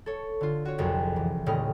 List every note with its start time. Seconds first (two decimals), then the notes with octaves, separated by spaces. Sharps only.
0.06 A4 C#5
0.41 D3 F4
0.65 F#4 C#5
0.78 C2 F2 F#3 G#3
1.16 E3
1.46 D#1 A2 C#3 G3 D#5 F6